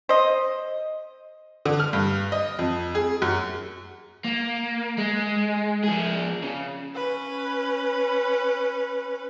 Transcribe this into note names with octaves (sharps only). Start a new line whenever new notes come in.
C5 D#5
D3
F6
G2
D#5
F2
G#4
F#2
A#3
G#3
F3 G#4
C#3
C#4 B4